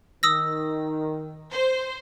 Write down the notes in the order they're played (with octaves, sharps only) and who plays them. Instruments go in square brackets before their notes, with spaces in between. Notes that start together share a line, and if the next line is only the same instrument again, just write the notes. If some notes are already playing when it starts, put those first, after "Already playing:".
[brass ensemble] D#3 [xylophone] D#6 E6 A#6
[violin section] C5